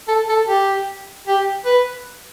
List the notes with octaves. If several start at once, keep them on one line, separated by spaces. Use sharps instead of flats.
A4
A4
G4
G4
B4